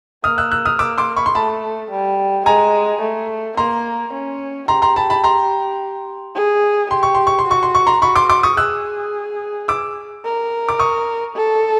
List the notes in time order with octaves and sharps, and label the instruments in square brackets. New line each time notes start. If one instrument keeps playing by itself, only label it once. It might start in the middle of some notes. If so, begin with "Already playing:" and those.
[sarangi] A#3 [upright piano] D#6 F6
[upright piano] E6 F#6
E6 F#6
D#6 F6
[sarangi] A#3 [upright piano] D6 E6
[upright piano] C6 D6
B5 C#6
C6
[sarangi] A3 [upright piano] A5 B5
[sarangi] G3
[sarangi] G#3 [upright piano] G#5 A#5
[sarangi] A3
[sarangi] A#3 [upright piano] A#5 C6
[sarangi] C#4
[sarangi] G4 [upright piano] A#5 C6
[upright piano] A#5 C6
A5 B5
A5 B5
A#5 C6
[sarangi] G#4
[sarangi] G4 [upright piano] C6
[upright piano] C#6
C6
C#6
C6
[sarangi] F#4 [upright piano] C#6
[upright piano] C6
C#6
A#5 C6
[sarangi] F#4 [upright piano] B5 C#6
[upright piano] C6 D6
C6 D6
C#6 D#6
[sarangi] G#4 [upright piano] E6 F#6
[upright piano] D6 E6
[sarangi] A#4
[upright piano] D6
C#6 D#6
[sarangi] A4